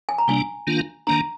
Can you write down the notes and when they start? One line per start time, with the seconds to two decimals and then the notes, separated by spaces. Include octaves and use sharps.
0.09 G#5
0.18 A#5
0.28 C3 G3 A#3 D4 G#5
0.67 D#3 A#3 D4 F4
1.07 D#3 A#3 D4 A#5